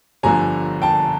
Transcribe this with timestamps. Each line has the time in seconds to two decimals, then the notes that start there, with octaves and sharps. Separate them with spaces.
0.23 G1 G2 D3 F3 G#5 A#5
0.82 G5 A5